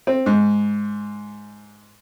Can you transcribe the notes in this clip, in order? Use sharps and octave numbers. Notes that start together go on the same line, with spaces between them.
C4
G#2